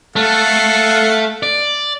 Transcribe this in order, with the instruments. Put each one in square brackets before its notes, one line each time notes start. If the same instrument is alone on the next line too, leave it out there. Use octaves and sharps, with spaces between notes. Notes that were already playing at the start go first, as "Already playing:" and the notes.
[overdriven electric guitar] A3 [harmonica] A4 F5 F#5
[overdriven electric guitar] D5